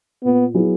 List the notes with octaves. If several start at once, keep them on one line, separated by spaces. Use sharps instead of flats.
A#2 B3
F#3 B3 E4 G#4